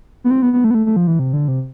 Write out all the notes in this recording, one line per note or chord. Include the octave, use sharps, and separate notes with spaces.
B3
C4
B3
B3
A3
B3
A3
A3
F3
E3
C3
D3
C3